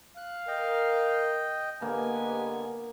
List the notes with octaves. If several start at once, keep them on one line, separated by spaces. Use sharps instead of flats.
F5 F#6
A#4 D#5 G5
D3 A#3 B3 G4 B4 D#5 G#5